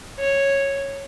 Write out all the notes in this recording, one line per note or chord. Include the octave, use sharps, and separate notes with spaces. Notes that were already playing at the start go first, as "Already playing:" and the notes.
C#5